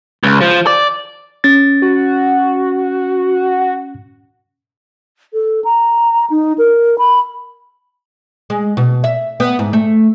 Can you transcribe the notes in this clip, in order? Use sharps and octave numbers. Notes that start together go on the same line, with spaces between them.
C#2
F3
D5
C#4 A6
F#4
A4
A#5
D#4
A#4
B5
G#3
B2
E5
B3
G#2
A3